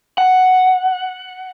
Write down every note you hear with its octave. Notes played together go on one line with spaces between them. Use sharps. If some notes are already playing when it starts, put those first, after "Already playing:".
F#5